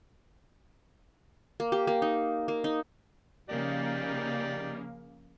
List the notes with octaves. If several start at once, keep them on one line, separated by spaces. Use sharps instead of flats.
A#3
G4
A#3
D#4
A#3
D#4
C#3 F3 A#3 D#4 G4 D5